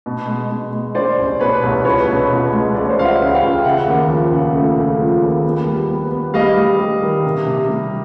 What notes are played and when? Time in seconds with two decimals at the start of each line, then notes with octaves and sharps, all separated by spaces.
0.06 B2
0.27 G#3
0.51 B2
0.73 G#3
0.95 C#4 C5 D5
1.18 C2
1.40 B2 B4 C#5
1.63 C2
1.85 C#2 B4 C#5
2.08 B2
2.31 C#2
2.52 G#3
2.74 G#3 D5
2.83 C#5
2.90 C5 D5
2.97 C#2 F5
3.04 E5 F#5
3.20 C#2
3.34 F5 G5
3.42 C#2
3.64 C#3 E5 F#5
3.88 D#2
4.10 F3
4.32 C#3
4.55 A3
4.77 C#3
5.00 F3
5.22 D#2
5.44 B3
5.67 G3
5.90 B3
6.11 B3
6.34 G3 D#5 F5
6.57 G3
6.79 G3
7.02 D#3
7.25 C3
7.46 C3
7.69 G3